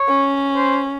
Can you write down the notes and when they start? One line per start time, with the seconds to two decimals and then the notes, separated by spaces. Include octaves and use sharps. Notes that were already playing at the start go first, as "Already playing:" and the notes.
Already playing: C#5
0.09 C#4
0.56 C5